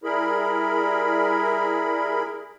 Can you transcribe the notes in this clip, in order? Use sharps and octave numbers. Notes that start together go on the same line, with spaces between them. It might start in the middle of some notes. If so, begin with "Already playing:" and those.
G3 E4 G#4 A#4 B5